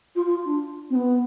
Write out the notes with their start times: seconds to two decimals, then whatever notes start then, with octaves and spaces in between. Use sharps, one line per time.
0.15 F4
0.25 F4
0.45 D4
0.90 C4
0.95 B3